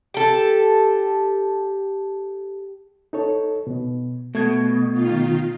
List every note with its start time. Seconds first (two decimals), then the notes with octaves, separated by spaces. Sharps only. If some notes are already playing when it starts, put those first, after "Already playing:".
0.14 G4 A4
3.13 D#4 A4 C#5
3.67 B2
4.35 B2 A3 G#6
4.93 D#3 F4